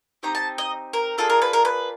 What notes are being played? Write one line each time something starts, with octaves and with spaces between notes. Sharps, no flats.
C4 D#4 G4 A#5
A5
D#5
A#4
A#3 D4 F4 G#4 A4
A#4
B4
A#4
B4